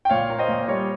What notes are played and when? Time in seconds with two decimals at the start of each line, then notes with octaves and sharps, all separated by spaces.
0.05 G5
0.10 A#2 C#5 F5
0.30 A#3
0.38 C5 D#5
0.48 A#2
0.68 G3 C#5